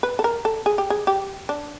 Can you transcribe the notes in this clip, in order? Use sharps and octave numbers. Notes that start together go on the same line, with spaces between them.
B4
A4
A#4
A4
G#4
G4
G#4
G4
D4